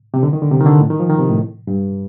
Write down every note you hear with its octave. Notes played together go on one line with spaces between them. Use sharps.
C3
D3
D#3
D3
C3
D#3
D3
A2
D#3
F3
D#3
C3
A2
G2